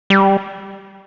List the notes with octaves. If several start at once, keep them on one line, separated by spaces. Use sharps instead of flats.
G3